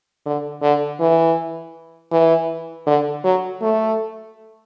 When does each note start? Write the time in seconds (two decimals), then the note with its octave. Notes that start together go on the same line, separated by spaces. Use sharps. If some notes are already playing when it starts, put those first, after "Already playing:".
0.26 D3
0.62 D3
1.00 E3
2.12 E3
2.87 D3
3.24 F#3
3.62 A3